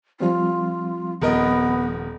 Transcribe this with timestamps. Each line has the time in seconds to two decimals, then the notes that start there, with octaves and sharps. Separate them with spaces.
0.20 F3 G3 C4 F4
1.22 D#1 B3 A#4 D#5